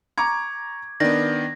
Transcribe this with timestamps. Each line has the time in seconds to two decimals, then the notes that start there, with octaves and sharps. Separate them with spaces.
0.18 A#5 C#6 D6 G#6
1.00 D#3 B3 D4 D5 A#6